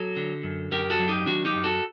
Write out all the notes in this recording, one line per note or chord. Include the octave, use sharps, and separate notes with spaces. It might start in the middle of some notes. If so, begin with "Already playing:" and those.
Already playing: F#3 F#4 A4
D3
F#2
F#2 G4 A#4
F#4 A4
F#3
D#4 G4
D#3 D4 F#4
D#4 G4
F#2
F#4 A4